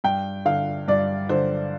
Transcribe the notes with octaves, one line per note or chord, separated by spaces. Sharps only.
G2 G5
D3 F5
G2 D5
D3 C5